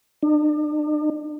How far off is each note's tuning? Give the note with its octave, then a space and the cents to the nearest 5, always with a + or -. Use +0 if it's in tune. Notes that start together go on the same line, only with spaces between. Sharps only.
D4 +45